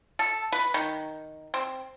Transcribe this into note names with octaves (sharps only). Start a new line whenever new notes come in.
A4
B4
D#3
C4